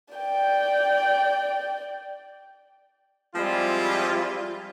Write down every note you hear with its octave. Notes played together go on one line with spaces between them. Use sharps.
D5 G5
F3 G3 G#3 C4 E4 F4